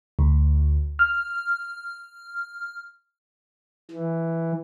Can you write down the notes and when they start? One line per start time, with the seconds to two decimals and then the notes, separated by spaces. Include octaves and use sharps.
0.19 D2
0.99 F6
3.91 E3